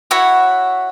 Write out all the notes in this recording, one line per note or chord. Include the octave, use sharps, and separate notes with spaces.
E4 F#4 C#5 F#5